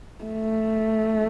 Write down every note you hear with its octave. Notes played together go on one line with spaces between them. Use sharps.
A3